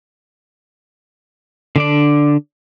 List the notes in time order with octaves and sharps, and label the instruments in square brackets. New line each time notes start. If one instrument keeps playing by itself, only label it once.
[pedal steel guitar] D3 D4 D5